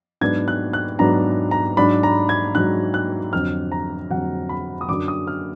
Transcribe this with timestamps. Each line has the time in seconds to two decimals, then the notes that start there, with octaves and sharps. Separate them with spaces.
0.21 G#2 F#3 B3 D4 G#6
0.48 F#6
0.73 F#6
0.99 G#2 F#3 B3 D4 A#5
1.51 A#5
1.77 G#2 F#3 D4 B5
2.03 A#5
2.29 G#6
2.55 G#2 F#3 D4 F#6
2.94 F#6
3.33 F2 D3 F#3 F6
3.72 A#5
4.11 F2 D3 F#3 F#5
4.49 B5
4.81 D#6
4.89 F#2 D3 F#3 D4 D6
5.08 D#6
5.27 F6